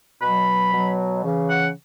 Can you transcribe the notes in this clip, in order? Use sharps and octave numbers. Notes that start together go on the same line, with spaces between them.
B2 F#3 B5
B2 F#3
C#3 E3
F#5